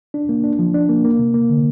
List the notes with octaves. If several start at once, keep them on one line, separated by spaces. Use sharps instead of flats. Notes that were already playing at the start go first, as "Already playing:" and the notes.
D4
A#3
D4
F3
D4
A#3
A#3
C3
A#3
D3